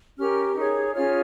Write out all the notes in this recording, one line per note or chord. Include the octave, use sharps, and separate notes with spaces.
C#4 G4 A#4 F6
D#4 G#4 C#5
C#4 F4 G#4 C#5 F6